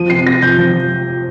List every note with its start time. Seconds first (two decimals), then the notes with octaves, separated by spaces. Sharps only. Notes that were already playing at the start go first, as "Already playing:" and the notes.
Already playing: F3 D#7
0.10 C3 C7
0.26 C3 A#6
0.42 F3 G6
0.58 F3